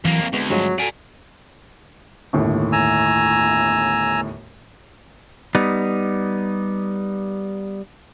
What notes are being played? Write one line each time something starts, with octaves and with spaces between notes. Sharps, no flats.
F2 E3 F#3 A#3
C4
D2 G#3 B3
G2 F3 F#3 G#3
F#4 A4 D5 G#5
G1 D#2 A2
G#5 A#5 E6
G3 B3 D#4